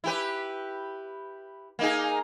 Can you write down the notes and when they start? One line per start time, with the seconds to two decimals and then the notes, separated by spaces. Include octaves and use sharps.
0.04 E4 G4 B4
1.79 A#3 D#4 G#4